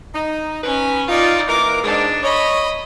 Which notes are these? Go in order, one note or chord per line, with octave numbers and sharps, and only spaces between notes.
D#4
C#4 D#4 B4 G#5
D#4 F4 D5
E3 A#3 A#4 D6
G#2 D4 D#4
C#5 D#5 B5